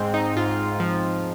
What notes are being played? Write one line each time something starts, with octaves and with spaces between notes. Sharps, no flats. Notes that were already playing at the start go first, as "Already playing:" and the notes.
Already playing: G#2 G#3 C4
D#4
G#2 F4
F3